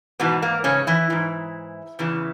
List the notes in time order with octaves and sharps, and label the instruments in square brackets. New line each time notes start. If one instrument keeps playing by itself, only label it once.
[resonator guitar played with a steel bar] G#2 B2 E3 B3
A#3
C#3 C#4
E3 E4
G#2 E3
E2 C#3 E3